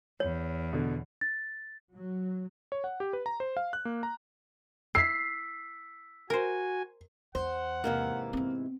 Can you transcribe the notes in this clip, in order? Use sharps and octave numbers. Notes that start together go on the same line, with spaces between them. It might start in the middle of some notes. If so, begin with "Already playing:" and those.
E2 C#5
B2 D3
A6
F#3
C#5
F#5
G4
B4
A#5
C5
F5
F#6
A#3
A#5
E4 E6 B6 C7
F#4 A#4 C5 G#5
E2 C5 F#5
G#2 C3 E3 A#3
B3 C4